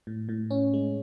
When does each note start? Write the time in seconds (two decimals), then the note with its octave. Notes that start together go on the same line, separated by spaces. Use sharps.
0.07 A2
0.29 A2
0.51 C#4
0.74 G#3